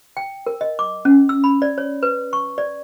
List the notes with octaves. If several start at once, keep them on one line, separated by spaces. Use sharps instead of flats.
G5
A#4
D#5
D6
C#4
E6
B5
D5
C#5
B4
C#6
D5